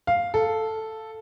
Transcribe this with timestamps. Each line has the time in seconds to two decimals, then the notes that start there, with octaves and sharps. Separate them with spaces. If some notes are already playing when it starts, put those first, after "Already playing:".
0.07 F5
0.34 A4